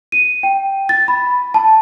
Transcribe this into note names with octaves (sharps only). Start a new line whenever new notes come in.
D#7
G5
A6
B5
A5